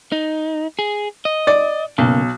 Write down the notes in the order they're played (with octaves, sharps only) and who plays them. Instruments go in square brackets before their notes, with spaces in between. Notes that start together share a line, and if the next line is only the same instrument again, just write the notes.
[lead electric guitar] D#4
G#4
D#5
[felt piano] D5
[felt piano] B1 [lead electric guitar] C#3 A#3